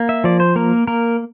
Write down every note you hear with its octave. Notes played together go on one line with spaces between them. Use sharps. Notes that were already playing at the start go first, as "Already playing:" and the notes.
Already playing: A#3
E5
F3 D5
C5
A#3 A#4
A#3 A#4